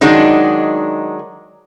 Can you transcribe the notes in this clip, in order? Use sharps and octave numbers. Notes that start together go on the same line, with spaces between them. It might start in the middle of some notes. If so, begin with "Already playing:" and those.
D#3 F#3 G#3 D4 D#4